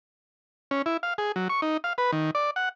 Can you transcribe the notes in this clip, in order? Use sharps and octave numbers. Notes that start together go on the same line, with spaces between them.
C#4
E4
F5
G#4
F#3
C#6
D#4
F5
B4
D#3
D5
F#5